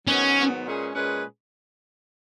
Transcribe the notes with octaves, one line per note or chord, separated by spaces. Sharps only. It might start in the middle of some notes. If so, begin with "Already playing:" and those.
G#2 D#3 F#3 B3 C#4
G#2 D#3 F#3 B3
A#2 G#3 C#4 G#4 B4
A#2 G#3 C#4 G#4 B4